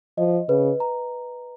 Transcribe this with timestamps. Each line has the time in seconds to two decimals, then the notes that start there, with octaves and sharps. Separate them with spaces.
0.18 F3 D#5
0.49 C#3 B4
0.80 A#5